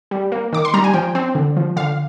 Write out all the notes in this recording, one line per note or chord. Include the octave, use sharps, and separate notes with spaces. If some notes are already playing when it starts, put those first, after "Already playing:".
G3
A#3
D#3 D6
C6
G3 A#5
G#5
F3 G5
C4
D3
F3
D3 F5